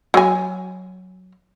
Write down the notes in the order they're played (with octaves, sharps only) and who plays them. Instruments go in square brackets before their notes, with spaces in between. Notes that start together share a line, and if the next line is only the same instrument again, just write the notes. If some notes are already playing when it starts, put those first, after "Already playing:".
[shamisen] F#3 G#5